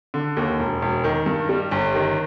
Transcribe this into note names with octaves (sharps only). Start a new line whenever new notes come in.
D3
D#2
E1
E1
D#3
G2
G3
G1
D#3